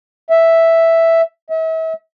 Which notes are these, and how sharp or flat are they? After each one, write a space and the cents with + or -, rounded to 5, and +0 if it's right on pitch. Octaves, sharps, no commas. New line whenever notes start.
E5 +0
E5 -40